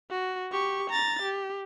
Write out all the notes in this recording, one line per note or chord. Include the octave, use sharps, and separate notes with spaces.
F#4
G4 C#6
A#5 A6
G4